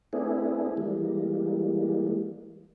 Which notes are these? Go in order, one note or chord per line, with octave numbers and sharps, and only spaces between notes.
A3 B3 C4 D4 E4 G#4
E3 G3 G#3 A#3